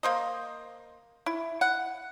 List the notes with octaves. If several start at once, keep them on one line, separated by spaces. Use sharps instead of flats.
A#3 C5 D#5
E4
F#5